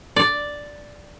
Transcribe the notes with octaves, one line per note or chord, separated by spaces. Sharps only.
D5